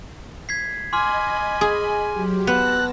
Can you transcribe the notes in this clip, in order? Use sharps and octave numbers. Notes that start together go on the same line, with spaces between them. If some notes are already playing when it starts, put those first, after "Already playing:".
G#6 B6 C7
D#5 G#5 B5 C6 D6 F6
G#4
F#3 G4
B3 A5 E6 F#6 A#6